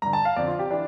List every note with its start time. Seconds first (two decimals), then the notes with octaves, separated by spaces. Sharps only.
0.02 G2 D3 A#5
0.13 A5
0.25 F5
0.36 F2 D3 D5
0.47 F4
0.59 G4
0.71 E3 D4